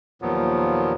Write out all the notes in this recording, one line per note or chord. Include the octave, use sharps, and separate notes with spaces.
D#2 A#2 F3 F#3 B3